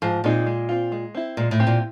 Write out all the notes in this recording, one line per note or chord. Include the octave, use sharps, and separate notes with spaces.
G#2 F3
A#2 G#3 C4 D#4 G#4
G#3
C4 F4
G#3
C4 E4
A#2 G#3
A2
C4 E4 G4
A#2